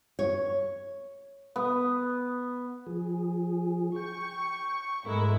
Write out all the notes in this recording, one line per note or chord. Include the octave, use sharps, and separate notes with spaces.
C#5
B3
F3 G#4
G5 C#6
G#2 G#3 A3 E4 A#4